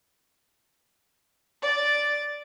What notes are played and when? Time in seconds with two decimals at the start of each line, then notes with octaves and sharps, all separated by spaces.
1.62 D5 A6